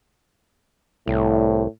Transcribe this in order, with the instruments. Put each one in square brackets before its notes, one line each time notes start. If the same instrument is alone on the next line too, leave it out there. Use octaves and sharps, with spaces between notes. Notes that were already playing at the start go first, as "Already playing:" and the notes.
[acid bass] C2 [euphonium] A2